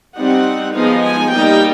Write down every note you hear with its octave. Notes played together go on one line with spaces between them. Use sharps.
G3 C4 D#4 F#5
F3 G#3 B3 D#4 F5
G#5
G3 A#3 D#4 G5